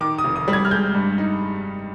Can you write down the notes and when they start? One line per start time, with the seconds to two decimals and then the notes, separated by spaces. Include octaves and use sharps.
0.01 D#3 D6
0.18 D#6
0.24 F1
0.36 D#6
0.48 G3
0.53 G#6
0.65 F6
0.71 G#3 G6
0.95 G2
1.18 D#4